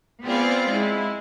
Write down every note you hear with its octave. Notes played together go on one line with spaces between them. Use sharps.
B3 C4 F4 G#4 D5 F5
G#3 E4